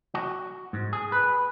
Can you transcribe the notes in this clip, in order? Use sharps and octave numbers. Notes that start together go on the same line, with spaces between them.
F#4
G#2
G#4
B4